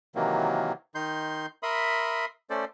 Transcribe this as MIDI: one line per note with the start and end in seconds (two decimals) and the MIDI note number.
0.15 0.72 48
0.15 0.72 51
0.15 0.72 52
0.15 0.72 54
0.15 0.72 58
0.95 1.46 51
0.95 1.46 63
0.95 1.46 84
0.95 1.46 91
1.63 2.25 70
1.63 2.25 76
1.63 2.25 83
1.63 2.25 84
1.63 2.25 87
2.50 2.65 57
2.50 2.65 61
2.50 2.65 69
2.50 2.65 72
2.50 2.65 74